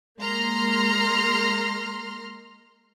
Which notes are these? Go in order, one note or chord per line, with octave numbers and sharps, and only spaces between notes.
G#3 A#3 A#5 C6 F6